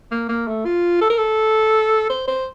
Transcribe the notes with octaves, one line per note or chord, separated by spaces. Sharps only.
A#3
A#3
A3
F4
A4
A#4
A4
C5
C5